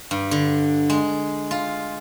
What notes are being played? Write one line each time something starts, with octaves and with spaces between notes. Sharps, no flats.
G2
D3
G#3
F4